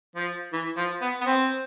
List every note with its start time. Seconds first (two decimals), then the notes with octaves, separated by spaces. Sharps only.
0.16 F3
0.53 E3
0.77 F3
1.01 B3
1.21 B3
1.26 C4